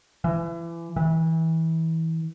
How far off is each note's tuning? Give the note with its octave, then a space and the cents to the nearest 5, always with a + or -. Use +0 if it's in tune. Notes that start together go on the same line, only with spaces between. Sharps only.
E3 +30
E3 -25